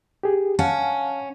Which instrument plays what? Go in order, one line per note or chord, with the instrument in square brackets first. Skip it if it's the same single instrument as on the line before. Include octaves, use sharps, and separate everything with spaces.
[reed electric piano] G4 G#4
[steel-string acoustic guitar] C#4 [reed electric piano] F5 F#5 A5